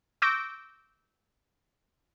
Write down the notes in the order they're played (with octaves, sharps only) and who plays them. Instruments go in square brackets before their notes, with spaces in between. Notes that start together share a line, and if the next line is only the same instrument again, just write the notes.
[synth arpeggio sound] C#6 D6 E6 G6 A#6 D7